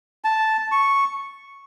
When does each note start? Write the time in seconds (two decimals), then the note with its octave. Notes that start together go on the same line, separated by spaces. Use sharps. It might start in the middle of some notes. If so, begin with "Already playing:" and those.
0.24 A5
0.72 C#6